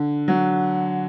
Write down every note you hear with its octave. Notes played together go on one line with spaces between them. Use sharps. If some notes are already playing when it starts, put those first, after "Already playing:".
Already playing: D3
F#3